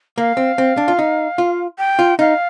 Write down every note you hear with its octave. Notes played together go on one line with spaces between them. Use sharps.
A#3 F5
C4
C4
D4
F4
D#4
F4
G5
F4
D#4 F5